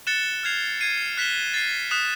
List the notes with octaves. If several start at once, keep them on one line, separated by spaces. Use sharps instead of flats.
F#6 A6 C#7 E7 G7
F6 G#6 C7 F7
G#6 C7 D#7
F#6 B6 E7 G7
A6 C7 D#7
D#6 F#6 B6 E7